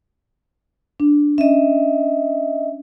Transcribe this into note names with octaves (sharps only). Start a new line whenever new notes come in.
D4
C#4 D#5 E5